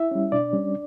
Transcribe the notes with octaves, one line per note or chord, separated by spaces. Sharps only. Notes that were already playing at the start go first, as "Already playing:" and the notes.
Already playing: E4 E5
G3 C#4
B2 D4 D5
G3 C#4